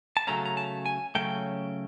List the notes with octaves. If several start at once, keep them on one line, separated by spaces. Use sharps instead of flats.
A5
C#3 F#3 A3 C#4 A#5
A#5
A5
G#5
C#3 F#3 A3 C#4 G5